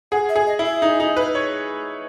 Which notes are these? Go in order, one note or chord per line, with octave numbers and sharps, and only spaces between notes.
G#4 F#5
E5
G#4
D#5
E4
E5
D#4
D#4
B4
C#5